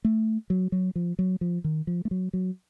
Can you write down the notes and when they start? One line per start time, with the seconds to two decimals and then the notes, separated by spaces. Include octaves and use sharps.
0.05 A3
0.50 F#3
0.72 F#3
0.96 F3
1.19 F#3
1.41 F3
1.64 D#3
1.87 F3
2.05 A3
2.11 F#3
2.33 F#3